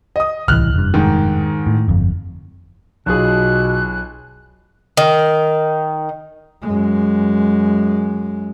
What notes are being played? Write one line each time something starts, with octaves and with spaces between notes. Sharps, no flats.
D#5 D#6
D1 C2 E3 F6 F#6
F1 G2
G#2 D#3
A2
G1 F2
B1 B2 F4 G#4 F#6
D#3
F#2 G#3